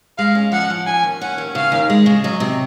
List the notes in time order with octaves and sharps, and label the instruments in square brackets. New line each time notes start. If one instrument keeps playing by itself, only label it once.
[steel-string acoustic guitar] G#3 [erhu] F5
[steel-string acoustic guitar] C#4
[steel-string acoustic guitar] F3 [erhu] F#5
[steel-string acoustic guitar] F3
[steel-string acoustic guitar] C#4 [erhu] G#5
[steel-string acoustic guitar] D#2
[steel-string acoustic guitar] C#4 [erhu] F#5
[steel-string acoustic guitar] D#2
[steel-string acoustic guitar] C#3 [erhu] F5
[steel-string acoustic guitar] D#2
G#3
C#3
[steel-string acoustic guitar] F#3 [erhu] D#5
[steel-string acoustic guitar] C3